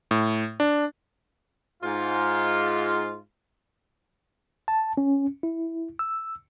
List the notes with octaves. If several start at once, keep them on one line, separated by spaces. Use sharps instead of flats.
A2
D4
G#2 F4
A5
C#4
E4
E6